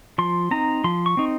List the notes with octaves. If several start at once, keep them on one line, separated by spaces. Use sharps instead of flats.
F3 C6
C4 D#4 A#5
F3 C6
C#6
C4 D#4